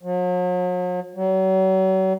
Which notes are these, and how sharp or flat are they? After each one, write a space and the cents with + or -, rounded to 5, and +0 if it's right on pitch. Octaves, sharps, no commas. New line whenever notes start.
F#3 -45
F#3 +40